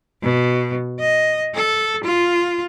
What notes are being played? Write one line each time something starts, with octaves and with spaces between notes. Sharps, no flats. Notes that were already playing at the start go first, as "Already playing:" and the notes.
B2
D#5
A4
F4